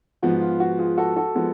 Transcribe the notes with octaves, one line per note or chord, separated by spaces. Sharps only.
G#2 F3 B3 F#4
F4
F#4
F4 G#4
F#4 A4
F#4 A4
F3 G#3 B3